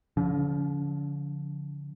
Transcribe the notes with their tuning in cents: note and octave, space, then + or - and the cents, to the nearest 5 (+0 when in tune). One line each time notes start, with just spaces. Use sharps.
D3 -40 F3 +0 C#4 +35